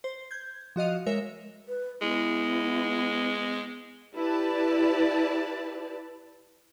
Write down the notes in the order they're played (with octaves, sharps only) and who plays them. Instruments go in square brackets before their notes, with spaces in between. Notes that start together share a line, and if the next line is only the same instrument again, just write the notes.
[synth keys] C5
G6 G#6
F3 F#4 D#5 F5
G#3 A#4 C#5 E5
[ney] B4
[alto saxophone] G#3 [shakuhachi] B3 [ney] E4
[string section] E4 G4 B4 D5 A5